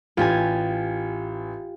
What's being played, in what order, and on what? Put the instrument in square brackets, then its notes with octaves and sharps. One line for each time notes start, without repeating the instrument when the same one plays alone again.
[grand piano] A1 [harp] F4 G4 G#5